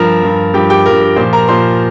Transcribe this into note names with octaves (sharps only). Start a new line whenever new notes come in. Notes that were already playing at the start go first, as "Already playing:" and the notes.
Already playing: G2 F3 A#4 A#5
G2 F3
G2 F3 G4 G5
G4 G5
G2 F3 A#4
A#4
A#2 F3 C5
A#4 A#5
A#2 F3 C5 C6